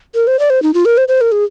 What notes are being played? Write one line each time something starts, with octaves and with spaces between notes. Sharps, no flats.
A#4
C5
D5
C5
D#4
F4
A#4
C5
C5
A#4
G#4